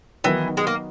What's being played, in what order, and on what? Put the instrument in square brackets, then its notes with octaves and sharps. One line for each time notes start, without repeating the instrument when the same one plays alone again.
[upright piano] D#3 F#3 B3 D#4 [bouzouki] E3
[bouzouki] G#3
A#3